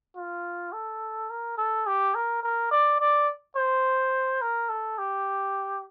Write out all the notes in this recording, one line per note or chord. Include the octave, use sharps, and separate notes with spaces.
F4
A4
A#4
A4
G4
A#4
A#4
D5
D5
C5
A#4
A4
G4